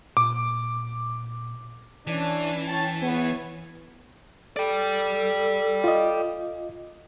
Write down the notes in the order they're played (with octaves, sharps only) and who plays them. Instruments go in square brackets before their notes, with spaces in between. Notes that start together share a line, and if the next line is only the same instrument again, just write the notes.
[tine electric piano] A#2 [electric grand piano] D6
[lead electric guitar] E3 [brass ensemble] C#4 D4
[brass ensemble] C#4 G5 A5
E2 B3 C#5
[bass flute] A4 [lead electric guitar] D5 G5
[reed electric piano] F4 D#5